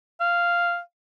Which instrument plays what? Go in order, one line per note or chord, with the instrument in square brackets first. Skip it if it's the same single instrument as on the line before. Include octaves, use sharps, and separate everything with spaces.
[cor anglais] F5